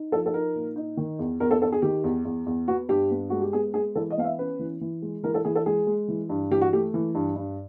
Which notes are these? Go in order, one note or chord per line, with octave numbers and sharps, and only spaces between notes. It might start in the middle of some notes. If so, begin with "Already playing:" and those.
Already playing: D#4
F3 A4
A4
D#4 A#4
A#2
D#4
D#3
E2
E2 A#4
A4
E2 A4
G#4
D#3 G4
E2
E2
E2
B3 F#4
G2 G4
B3
G#3 F#4
G4
B3 G#4
G#3 G#4
E3 A4
D#5
B3 F5
E5
C#4 B4
E3
E3
G#3
E3 A#4
A4
E3 G#4
A4
G#3 G#4
G#3
E3
G2
E3 G4
F#4
A3 G4
E3
G2
G2